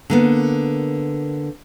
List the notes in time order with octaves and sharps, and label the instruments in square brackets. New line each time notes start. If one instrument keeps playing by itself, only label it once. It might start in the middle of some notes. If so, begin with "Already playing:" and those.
[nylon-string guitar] D3 A#3 B3